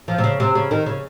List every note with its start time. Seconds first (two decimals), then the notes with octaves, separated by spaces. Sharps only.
0.08 F3
0.18 C3
0.24 C#3
0.40 C3
0.55 C#3
0.71 D#3
0.86 C#3